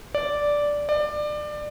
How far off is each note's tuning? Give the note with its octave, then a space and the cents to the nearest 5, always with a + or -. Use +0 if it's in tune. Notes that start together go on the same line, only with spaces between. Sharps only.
D5 -5
D5 +25